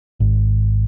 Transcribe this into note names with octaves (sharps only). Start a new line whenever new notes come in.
G#1